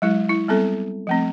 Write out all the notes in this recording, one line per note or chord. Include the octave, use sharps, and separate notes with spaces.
F#3 G#3 E4
E4
G3 B3 C4 A4
F3 A3 C4